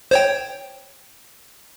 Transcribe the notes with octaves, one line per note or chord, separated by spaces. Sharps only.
C5 C#5 G5